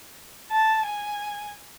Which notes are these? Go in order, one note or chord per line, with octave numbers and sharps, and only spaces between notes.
A5
G#5